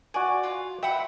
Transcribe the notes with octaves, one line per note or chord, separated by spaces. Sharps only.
F#4 D5 G#5
F4
E5 F#5 G5 B5